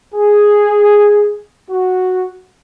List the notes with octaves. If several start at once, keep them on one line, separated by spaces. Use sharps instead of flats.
G#4
F#4